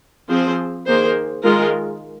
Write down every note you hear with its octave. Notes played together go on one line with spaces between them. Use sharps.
F3 C4 G#4 C5
D#3 A#3 G#4 C5
D#3 G#3 F4 A#4